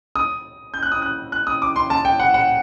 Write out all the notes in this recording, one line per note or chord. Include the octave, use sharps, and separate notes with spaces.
D#6
G6
F#6
D#6
F#6
F#6
D#6
D6
C6
A5
G5
F#5
F#5